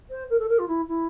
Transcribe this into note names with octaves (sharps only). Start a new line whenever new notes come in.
C5
A#4
A4
A#4
F4
E4
E4